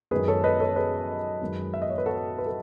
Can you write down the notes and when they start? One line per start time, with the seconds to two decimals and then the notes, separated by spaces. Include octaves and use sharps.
0.11 F#2 D#3 G#3 G#4 B4
0.28 A4 C#5
0.44 B4 D#5
0.60 A4 C#5
0.76 G#4 B4
1.41 F#2 D#3 G#3
1.74 E5
1.82 D#5
1.90 C#5
1.98 B4
2.06 F#4 A4
2.38 B4
2.46 A4